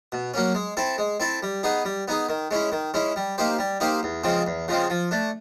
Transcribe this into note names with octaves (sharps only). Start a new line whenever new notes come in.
B2
F#3 A#3 C#4
G#3
C4 E4 A4
G#3
C4 E4 A4
G3
B3 D#4 G#4
G3
B3 D#4 G#4
D#3
G#3 C#4 E4
D#3
G#3 C#4 E4
G3
A#3 D#4 G4 C5
G3
A#3 D#4 G4 C5
E2
C#3 F3 G#3 C4
E2
C#3 F3 G#3 C4
F3
A3 D4